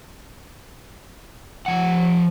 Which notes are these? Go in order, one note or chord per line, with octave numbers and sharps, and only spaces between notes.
F3 F#5